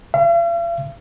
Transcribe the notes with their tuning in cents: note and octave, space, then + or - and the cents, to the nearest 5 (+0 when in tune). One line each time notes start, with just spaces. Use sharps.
F5 -45